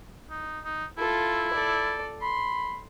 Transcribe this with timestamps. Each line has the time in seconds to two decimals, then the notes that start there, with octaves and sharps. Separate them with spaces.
0.30 D#4
0.65 D#4
0.98 E4 F4 A4
1.53 A4 D5
2.22 B5 C6